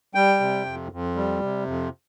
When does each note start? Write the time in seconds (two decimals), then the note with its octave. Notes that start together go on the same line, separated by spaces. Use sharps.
0.15 G3 G5
0.40 C3
0.66 F2
0.92 F2
1.16 G3
1.42 C3
1.67 F2